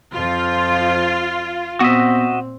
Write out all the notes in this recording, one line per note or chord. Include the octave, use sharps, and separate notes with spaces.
F2 F3 F4
A#2 B3 C4 F#4 D#5 E5